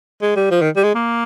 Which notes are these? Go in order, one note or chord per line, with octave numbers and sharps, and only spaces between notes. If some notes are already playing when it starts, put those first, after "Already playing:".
G#3
G3
F3
D#3
G3
G#3
A#3